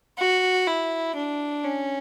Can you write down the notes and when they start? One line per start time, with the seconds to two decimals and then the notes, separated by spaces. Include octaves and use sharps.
0.19 F#4
0.67 E4
1.16 D4
1.64 C#4